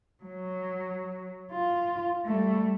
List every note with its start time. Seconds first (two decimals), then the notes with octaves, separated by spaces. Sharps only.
0.23 F#3
1.51 F4
2.26 G3 A3